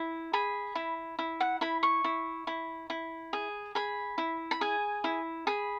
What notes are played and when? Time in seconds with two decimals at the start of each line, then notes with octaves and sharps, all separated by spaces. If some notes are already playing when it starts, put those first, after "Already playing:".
Already playing: E4
0.33 G#4 B5
0.75 E4
1.19 E4
1.40 F#5
1.61 E4 B5
1.83 C#6
2.04 E4
2.47 E4
2.90 E4
3.33 G#4
3.75 G#4 B5
4.18 E4
4.51 B5
4.61 G#4 G#5
5.04 E4
5.47 G#4 B5